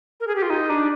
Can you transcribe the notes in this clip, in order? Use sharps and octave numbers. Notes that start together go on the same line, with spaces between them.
A#4
G#4
G4
F4
D#4
D4